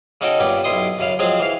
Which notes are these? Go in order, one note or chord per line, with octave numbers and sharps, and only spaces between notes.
C#3 C#4 D#4 F#4 A4 G5
G2 A#2 B3 C#4 G5 D6
B1 G2 B2 E4 C6 D#6
F#2 C#3 F5
F3 F#3 G#3 C4 G#4
E3 F5